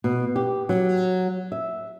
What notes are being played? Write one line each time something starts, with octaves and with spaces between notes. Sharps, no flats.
B2
G4
F#3
E5